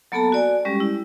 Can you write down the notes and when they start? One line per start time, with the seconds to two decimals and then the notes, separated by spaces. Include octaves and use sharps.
0.12 F#3 A#3 B3 A4 A5 A#5
0.32 F#4 D5 G#5
0.65 G3 G#3 C#4 G4
0.80 E4